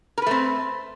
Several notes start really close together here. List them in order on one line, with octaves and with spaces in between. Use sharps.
A#4 B4 A3 C4